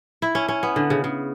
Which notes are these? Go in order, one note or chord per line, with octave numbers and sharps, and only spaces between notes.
E4
C#4
C#4
B3
D3
C#3
C#3